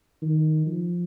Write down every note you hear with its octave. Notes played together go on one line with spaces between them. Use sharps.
D#3
F3